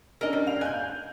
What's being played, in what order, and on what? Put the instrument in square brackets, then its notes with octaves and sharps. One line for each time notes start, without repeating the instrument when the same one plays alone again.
[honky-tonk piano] C#4 D4 [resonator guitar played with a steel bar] A#4 D#5
[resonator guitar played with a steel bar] G3
[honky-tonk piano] F5 F7
[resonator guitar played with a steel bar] G#5 [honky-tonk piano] F#6 G6